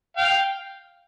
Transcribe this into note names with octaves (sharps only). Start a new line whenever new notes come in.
F5 G5